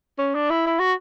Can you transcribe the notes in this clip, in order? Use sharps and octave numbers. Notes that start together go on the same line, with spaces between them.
C#4
D4
E4
E4
F#4